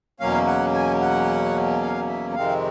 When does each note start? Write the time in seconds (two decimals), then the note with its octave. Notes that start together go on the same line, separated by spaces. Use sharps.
0.20 E2 B2 F#3 A#3 C#4 F5
0.47 F#5
0.74 G#5
1.01 F#5
1.82 F5
2.08 E5
2.35 F2 C3 D#3 G#3 C4 F5